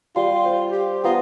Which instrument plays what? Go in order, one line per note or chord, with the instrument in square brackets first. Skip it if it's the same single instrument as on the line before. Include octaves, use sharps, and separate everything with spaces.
[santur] G3 C6 [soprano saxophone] F4
[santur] C5 F5
[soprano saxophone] G4
[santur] B3 A#5 D#6 [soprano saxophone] F4